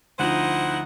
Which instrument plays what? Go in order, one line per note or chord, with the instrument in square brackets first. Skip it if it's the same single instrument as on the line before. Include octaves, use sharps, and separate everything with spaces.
[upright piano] D2 F3 [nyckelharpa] D#4 [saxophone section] E4 C5 F#5